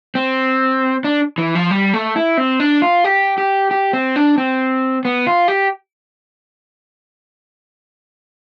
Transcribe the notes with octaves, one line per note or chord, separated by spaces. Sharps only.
C4
D4
E3
F3
G3
A3
E4
C4
D4
F4
G4
G4
G4
C4
D4
C4
B3
F4
G4